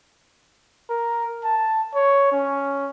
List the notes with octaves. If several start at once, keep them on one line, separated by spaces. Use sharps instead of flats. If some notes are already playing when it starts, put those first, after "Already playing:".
A#4
A5
C#5
C#4